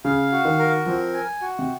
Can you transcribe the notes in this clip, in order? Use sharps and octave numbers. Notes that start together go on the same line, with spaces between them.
C#3 F5
F#4
D#3
A#4
F3 C4
G#5
F#4
C3